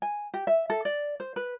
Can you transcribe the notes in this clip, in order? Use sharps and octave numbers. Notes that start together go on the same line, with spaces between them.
G#5
G4
E5
A4
D5
C5
B4